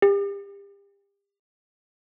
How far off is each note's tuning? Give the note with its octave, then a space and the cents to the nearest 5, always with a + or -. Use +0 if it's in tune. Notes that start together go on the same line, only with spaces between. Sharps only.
G4 +35